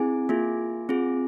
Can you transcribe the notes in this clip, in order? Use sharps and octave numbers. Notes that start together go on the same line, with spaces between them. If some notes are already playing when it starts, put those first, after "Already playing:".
Already playing: C4 E4 G#4 G#5
A#3 F4 G#4
C4 F4 G#4